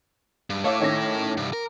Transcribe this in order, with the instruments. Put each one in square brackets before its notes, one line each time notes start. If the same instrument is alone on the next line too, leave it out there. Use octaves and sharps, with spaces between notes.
[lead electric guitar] G2
[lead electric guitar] A3 E4 [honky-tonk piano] C#5 F5 D6
[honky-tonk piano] D#3 C#4 A#6
[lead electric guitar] C2 G2
A#4